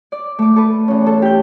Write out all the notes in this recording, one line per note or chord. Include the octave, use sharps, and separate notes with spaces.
D5
A3 D6
A4 B4
E2 C#4
A4
G4 G6